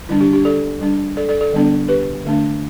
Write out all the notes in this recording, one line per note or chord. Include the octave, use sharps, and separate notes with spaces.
D3 G3 D4 E4
D4 G4
D4 G4
A4 D5
G3 D4
A4 D5
A4 D5
A4 D5
D3 G3 B3 D4
G4 B4
D3 A3 D4